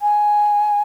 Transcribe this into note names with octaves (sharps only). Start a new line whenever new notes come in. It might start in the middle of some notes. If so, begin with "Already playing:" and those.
G#5